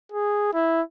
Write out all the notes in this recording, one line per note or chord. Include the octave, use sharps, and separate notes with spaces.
G#4
E4